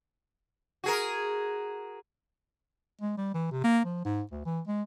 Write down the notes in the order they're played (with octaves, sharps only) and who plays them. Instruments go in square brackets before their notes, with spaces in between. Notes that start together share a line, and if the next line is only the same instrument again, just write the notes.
[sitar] F#4 G#4 A#4
[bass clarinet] G#3
G3
E3
C3
A#3
F3
G#2
D2
E3
G#3